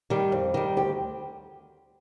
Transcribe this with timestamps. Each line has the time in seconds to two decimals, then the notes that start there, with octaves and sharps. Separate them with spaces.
0.10 D#3 G3
0.32 F2
0.54 D#3 G3
0.77 D2 G4